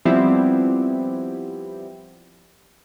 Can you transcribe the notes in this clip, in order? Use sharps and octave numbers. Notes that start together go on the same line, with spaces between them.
F3 G3 B3 C4 E4 G4